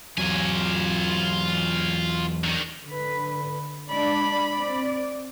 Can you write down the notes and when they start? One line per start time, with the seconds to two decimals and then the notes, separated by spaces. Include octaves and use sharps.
0.18 E2 F#3 F4 G#5
2.44 D3 D#3
2.87 D3 B4
3.89 G#3 D4 D5 B5
4.55 C4 D5